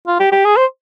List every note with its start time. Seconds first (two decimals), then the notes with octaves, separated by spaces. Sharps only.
0.07 F4
0.20 G4
0.32 G4
0.45 G#4
0.57 C5